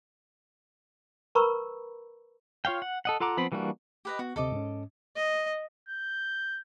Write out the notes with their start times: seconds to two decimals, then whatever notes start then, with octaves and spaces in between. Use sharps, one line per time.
1.35 A#4 B4 A#5 B5 C#6 E6
2.65 F4 C#5 F5 G5
2.82 F#5
3.05 A4 D#5 F#5
3.20 F4 A4 F#5 A#5 D6
3.37 F3 B3 C4 B5
3.52 E3 G3 A#3 D4 F#4
4.05 G4 B4 D#5
4.19 B3 F#4
4.36 D2 C3 A4 D#5 D6
4.52 G#2 C#4
5.16 D#5
5.88 G6